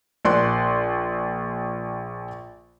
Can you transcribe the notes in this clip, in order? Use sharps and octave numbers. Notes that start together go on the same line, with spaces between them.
A#1 D5 C6 F#6